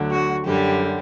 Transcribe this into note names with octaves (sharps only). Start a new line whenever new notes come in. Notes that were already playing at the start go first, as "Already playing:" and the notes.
Already playing: D2 D3 F#3
F#4
F#2 D3 G3 G4